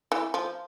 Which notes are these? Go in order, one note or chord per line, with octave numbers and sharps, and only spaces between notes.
E3
F3